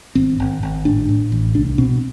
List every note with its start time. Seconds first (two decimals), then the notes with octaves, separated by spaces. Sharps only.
0.15 G#1 C4
0.40 G#1
0.63 G#1
0.85 A2 D4
1.09 A2
1.32 A1
1.55 C2 D4
1.78 B2 C4